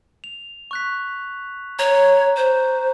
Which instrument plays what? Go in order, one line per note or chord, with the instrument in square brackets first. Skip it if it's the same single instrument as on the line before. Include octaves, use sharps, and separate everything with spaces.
[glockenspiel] F7
C#6 F#6 B6
[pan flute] C#5 [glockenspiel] A#5
[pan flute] C5